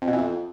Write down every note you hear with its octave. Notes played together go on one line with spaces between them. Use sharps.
F2
B2
E3
F2